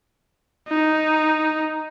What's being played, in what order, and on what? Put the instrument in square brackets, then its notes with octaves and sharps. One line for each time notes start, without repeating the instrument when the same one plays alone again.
[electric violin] D#4